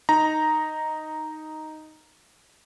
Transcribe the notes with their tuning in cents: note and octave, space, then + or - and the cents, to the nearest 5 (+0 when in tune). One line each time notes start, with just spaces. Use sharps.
D#4 +0 A#5 +0